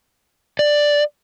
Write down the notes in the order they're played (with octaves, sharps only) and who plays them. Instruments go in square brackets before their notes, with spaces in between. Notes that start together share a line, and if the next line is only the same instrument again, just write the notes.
[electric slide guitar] D5